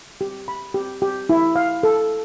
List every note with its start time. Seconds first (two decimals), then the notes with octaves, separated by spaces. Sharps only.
0.21 G4
0.48 B5
0.74 G4
1.02 G4
1.29 E4
1.56 F5
1.83 A4